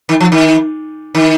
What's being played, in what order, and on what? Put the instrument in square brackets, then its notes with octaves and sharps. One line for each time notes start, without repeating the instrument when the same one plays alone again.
[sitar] D#3
F3
D#3
D#3